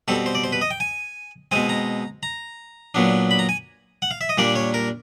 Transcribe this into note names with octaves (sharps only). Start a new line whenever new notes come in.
B2 G3 C4 A4
C5
D5
C5
B4
D#5
G5
G#5
B2 G#3 C4 G#5
A#5
A#5
A#2 F#3 B3 D4
B5
A#5
G#5
F#5
F5
E5
D#5
A#2 G3 A#3 D4 D5
C#5
A#4